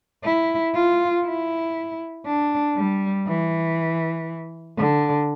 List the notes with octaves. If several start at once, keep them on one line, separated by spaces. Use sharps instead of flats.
E4
F4
E4
D4
G3
E3
D3